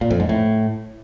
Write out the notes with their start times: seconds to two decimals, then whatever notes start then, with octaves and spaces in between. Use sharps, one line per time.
0.01 A#2
0.11 F2
0.20 G#2
0.29 A2